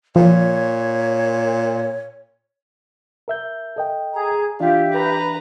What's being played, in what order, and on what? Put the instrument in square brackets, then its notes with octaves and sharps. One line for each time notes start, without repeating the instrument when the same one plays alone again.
[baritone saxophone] A#2 [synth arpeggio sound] F3 [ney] C#5
[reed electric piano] A#4 E5 G6
A4 D#5 G5
[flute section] G#4 A#5
[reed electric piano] E3 D4 [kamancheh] F4 [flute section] G4 E5
[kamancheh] B4 A#5